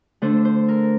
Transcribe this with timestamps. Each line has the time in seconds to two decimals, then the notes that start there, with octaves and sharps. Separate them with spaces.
0.22 D3 A3 D4 C5
0.45 C5
0.69 A#4